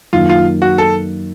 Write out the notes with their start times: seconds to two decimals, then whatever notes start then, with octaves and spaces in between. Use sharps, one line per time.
0.13 F#2 D#3 A#3 F4
0.29 F4
0.62 F#4
0.78 A4